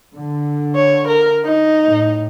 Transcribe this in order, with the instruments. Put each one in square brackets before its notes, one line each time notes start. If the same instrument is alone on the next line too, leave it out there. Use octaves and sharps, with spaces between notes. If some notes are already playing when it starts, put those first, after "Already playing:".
[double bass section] D3
[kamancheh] C#5
A#4
D#4
[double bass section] A2